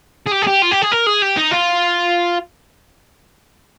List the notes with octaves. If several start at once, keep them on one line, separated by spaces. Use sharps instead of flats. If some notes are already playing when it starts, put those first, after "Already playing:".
G#4
G4
G#4
G4
F4
G4
G#4
A#4
G#4
G4
D#4
F4